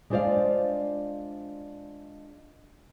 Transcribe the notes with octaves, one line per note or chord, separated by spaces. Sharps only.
G#3 D4 F4 C5 D5 F5